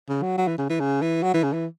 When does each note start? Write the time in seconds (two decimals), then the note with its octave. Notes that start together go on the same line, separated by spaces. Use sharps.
0.09 C#3
0.22 F#3
0.38 F#3
0.48 E3
0.58 C#3
0.70 E3
0.80 C#3
1.02 E3
1.23 F#3
1.34 E3
1.43 C#3
1.53 E3